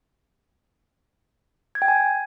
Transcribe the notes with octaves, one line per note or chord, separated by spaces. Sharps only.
G#6
G5
G#5